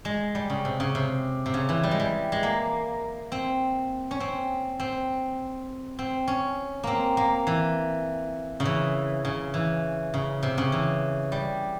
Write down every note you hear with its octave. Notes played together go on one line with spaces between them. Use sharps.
G#3
G3
C#3
C3
C#3
C3
C3
C#3
E3
G3
G#3
G3
G#3
A#3
C4
C#4
C4
C4
C4
C#4
A#3 C4
A#3
E3
C#3
E3
C#3
E3
C#3
C3
C#3
E3
G3